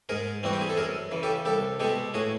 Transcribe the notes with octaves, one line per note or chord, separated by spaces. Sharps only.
G#2 G#4 A#4
E3 G3 C4 F#4
G4
G#4
A4
F#2 G#4 A#4
C#3 E3
G4 A4
C2 G4 A4
B2 G#3 G4 A4
A2 F#4 G#4